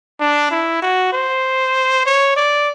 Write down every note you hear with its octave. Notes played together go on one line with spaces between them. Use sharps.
D4
E4
F#4
C5
C#5
D5